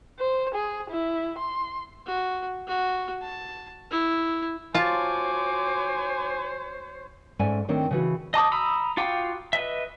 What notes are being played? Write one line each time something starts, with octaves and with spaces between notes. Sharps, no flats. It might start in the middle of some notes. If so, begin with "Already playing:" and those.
C5
G#4
E4
C6
F#4
F#4
A5
E4
F4 F#4 C5 C#5 G#5 A5 D6
G#2 C#4 A4 D5 E5 G#5
D#3 A3 C4 D4 C#5
C#3 E3 F#4
D#5 A5 D6 D#6
A#5 B5 D#6 E6
F4 F#4 F5 G5 D6
B4 D#5 E5